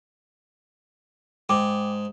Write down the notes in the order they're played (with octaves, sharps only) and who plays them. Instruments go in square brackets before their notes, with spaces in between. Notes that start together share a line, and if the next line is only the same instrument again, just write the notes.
[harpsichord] G#2 [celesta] G5 D6